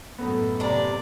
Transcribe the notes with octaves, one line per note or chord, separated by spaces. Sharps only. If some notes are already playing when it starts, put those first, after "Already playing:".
F#2 A2 B3 D#4 A4
C3 D4 D5 A#5